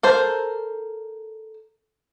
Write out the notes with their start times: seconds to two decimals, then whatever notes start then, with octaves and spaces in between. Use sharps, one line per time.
0.03 A4 A#4 C5